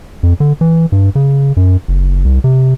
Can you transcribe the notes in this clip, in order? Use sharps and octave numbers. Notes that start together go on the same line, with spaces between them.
F2
D3
E3
G2
C#3
F#2
F#1
C2
C3